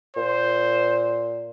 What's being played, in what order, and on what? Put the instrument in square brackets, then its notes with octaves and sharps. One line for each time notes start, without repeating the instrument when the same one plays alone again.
[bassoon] A#2 [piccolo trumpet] C5